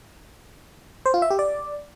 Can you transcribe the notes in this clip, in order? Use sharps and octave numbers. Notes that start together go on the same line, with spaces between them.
C5
F4
E5
G4
D5